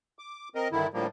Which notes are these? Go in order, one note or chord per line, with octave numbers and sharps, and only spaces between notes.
D6
C4 A#4 D#5
G2 D3 D#3 E4
A2 D3 F3 G3 A#3